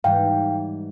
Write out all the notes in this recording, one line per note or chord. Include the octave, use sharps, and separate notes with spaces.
G#2 E3 G3 F5 G5